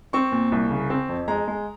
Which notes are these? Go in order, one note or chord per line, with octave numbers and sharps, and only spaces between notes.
C4 C#6
A#2
C2
C#3
C4
F2
G#3 A#5
G#3